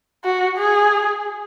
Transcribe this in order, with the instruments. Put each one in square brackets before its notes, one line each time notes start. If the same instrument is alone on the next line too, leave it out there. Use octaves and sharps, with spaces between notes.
[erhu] F#4
G#4